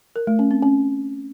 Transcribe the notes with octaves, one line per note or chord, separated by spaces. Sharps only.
A#4
A3
C#4
C4
C#4